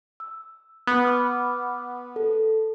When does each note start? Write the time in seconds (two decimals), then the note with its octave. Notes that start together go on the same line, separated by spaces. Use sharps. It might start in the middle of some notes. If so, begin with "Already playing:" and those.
0.20 E6
0.87 B3
1.05 B5 D6 F6
2.16 A4